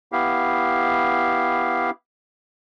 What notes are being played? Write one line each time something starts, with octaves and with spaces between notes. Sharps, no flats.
B3 E4 G4 F5